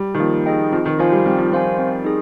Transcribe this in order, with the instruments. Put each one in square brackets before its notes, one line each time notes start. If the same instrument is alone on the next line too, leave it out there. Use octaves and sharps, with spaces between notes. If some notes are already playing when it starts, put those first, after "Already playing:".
Already playing: [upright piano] G3
D#3
[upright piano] F3 [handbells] A#3
[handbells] D#4 G#4 D#5 G5
[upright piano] F3 [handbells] C4
[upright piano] D#3
[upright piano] F3 [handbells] F4 C5 F5 G#5
[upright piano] G3
[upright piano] G3 [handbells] C4
[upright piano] F3
[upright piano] F3 [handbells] F4 C5 F5 G#5
[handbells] C4
D#4 G#4